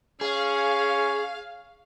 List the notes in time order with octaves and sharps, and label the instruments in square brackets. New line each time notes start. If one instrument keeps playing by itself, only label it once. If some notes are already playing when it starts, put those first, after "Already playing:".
[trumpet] C#4 [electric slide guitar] G#4 [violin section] F5